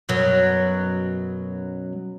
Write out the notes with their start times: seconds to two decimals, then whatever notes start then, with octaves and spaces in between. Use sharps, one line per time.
0.09 F#2 B2 F#3